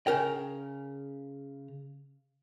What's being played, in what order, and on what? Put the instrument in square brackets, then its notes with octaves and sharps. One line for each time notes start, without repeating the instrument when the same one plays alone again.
[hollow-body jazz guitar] C#3 A#4 G5